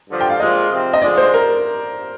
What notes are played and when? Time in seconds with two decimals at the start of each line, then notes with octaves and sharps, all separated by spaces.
0.09 G2 D3 F3
0.21 G5
0.30 F5
0.40 A#2 F3 G#3 D4 F4 D#5
0.71 C3 F3 C4
0.93 D#5
1.02 D3 F3 G#3 D5
1.18 C5
1.34 A#4